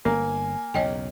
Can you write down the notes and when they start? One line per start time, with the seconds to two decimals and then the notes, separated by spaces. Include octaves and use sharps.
0.05 G1 A#3 G#5
0.74 B1 E2 C#3 C#5 D#5 G5